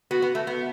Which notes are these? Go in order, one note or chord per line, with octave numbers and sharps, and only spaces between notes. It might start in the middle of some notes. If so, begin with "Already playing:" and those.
B3 F#4
B3
A3
B3